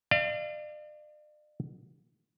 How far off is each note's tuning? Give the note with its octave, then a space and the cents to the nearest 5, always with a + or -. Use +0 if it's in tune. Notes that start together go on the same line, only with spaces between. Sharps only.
D5 +40 F5 -30